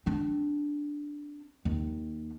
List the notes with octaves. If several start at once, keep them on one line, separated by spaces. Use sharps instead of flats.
C4 D4
D#2